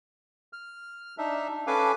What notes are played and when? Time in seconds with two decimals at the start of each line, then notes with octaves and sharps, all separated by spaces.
0.53 F6
1.18 D4 D#4 E5
1.67 C#4 A4 B4 F5 G#5 D6